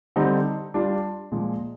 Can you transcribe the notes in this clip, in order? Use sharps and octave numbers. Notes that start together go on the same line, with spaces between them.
D3 G3 C4 D#4
G3 D4 F4
A#2 F3 G#3